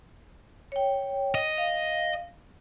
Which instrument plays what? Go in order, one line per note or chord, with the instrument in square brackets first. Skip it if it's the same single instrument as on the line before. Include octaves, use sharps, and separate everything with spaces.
[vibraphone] C#5 G5
[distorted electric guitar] D#5
[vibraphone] F5